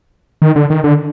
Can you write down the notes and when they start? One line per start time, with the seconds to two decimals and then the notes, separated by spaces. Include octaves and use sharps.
0.42 D#3
0.56 D3
0.70 D#3
0.84 D3